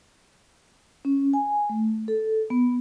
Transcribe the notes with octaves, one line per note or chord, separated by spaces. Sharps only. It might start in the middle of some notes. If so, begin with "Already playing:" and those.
C#4
G#5
A3
A4
B3